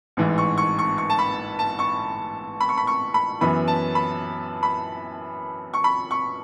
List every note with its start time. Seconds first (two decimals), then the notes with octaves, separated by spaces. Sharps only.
0.17 A1 G#2 E3
0.38 C#6
0.58 C#6
0.79 C#6
0.98 C#6
1.10 A5
1.19 B5
1.59 A5
1.79 C#6
2.61 B5
2.69 C#6
2.77 B5
2.87 C#6
3.14 B5
3.41 F#2 E3 B3 B5
3.68 A5
3.95 B5
4.63 B5
5.74 C#6
5.84 B5
6.11 C#6